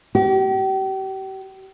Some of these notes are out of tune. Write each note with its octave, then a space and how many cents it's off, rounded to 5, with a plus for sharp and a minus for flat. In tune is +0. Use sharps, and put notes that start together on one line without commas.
G4 -40